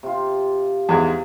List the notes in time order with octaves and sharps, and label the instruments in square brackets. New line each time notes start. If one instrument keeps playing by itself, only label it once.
[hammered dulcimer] C3 F4
[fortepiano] E2 G#2 G#3